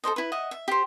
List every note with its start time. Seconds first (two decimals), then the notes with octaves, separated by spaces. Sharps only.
0.04 A4 A#4 C5 D#5
0.16 E4 B4
0.32 D#5 E5 F#5
0.51 E5
0.68 G4 C5